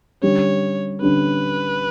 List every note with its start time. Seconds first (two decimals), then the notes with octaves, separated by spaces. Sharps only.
0.22 D3 G3 C#4 C#5
1.01 D3 G3 C#4 B4